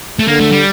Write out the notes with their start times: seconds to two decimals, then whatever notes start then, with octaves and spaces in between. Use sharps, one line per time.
0.19 A3
0.27 D3 A#3
0.40 A3
0.52 G3